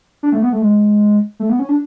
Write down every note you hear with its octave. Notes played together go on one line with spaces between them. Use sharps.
D4
A3
B3
A3
G#3
A3
B3
C#4
D4